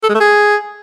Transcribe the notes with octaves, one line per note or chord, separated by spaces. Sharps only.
A4
G#3
A3
G#4